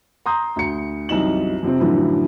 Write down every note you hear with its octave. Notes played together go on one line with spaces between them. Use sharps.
A#5 C6 D#6 G6
D2 C#7
C2 F#2 E3 D#4 E7 F#7
F2 C3 F3 C4
F#2 A2 D3 E3 F3